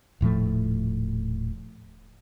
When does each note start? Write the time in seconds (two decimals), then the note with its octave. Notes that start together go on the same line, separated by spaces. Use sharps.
0.21 D#1 A2 F3 A3